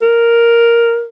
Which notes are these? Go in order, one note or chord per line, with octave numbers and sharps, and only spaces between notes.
A#4